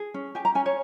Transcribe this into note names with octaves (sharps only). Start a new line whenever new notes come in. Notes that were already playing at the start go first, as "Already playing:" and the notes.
Already playing: G#4
C#4
G4 G#5
A#5
C#4 G#5
C#5